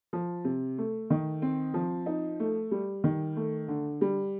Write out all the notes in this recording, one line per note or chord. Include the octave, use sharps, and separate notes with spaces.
F3
C3
A3
D#3
C4
F3
D#4
A3
G3
D#3
A3
D3
G3